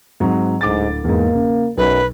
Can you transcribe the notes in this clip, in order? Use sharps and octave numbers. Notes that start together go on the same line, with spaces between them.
G#2 F#3 C4
D1 G#2 D6 A6
E2 G#2 A#3
C#3
B1 F#2 B4